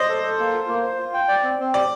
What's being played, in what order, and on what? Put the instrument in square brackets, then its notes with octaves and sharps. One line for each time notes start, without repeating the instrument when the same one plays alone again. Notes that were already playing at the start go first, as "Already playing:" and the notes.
Already playing: [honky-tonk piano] C5 D5 [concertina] D#5
[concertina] A4
A4
A#3
F4
A#3
C5
F4
G5
D5
C4
C4
[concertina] G4 [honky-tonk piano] D5